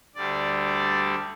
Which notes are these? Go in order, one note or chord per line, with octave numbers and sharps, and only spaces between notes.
D2 D3 G3 D5
D5